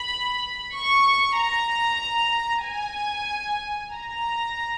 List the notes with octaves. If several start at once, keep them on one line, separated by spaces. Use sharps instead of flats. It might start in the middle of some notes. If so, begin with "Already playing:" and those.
Already playing: B5
C#6
A#5
G#5
A#5